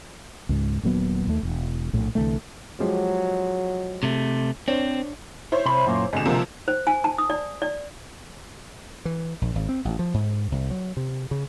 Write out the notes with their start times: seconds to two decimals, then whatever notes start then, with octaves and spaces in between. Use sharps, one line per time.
0.49 C#2 G#2
0.83 D#1 A#2 F#3 B3
1.27 D#2 A3
1.43 E1
1.93 A#1 A2
2.15 C2 D3 E3 A3
2.80 F3 F#3 G#3 G4
4.03 C3 A3
4.68 C4 D4 C5 C#5
5.52 E4 C5 C#5
5.66 C3 B5
5.87 F#2 A#2 A#3
6.13 G#1 B2 D3 G#3 E7
6.25 C3 F3 A#3
6.68 C5
6.87 G#5
7.04 A5
7.18 D#6
7.30 D5
7.62 D5
9.05 E3
9.42 A#1
9.55 G#1
9.69 C4
9.85 A1
9.99 F3
10.14 G#2
10.52 C2
10.71 F#3
10.97 C3
11.31 C#3